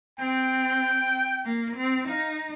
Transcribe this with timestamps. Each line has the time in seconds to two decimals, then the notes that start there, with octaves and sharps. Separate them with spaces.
0.19 C4 G5
1.45 A#3
1.77 C4
2.09 D#4 F5